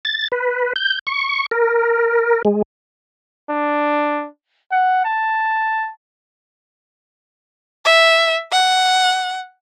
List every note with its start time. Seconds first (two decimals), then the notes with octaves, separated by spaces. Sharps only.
0.05 A6
0.32 B4
0.76 G6
1.07 C#6
1.51 A#4
2.45 G#3
3.49 D4
4.71 F#5
5.05 A5
7.85 E5
8.52 F#5